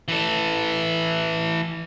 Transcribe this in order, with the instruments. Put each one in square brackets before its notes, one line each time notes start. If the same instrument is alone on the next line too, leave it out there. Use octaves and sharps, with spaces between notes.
[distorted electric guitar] E3 A4